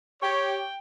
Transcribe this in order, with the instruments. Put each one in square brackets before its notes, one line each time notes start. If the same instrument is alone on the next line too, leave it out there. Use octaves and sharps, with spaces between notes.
[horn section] G4 C#5 [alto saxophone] G5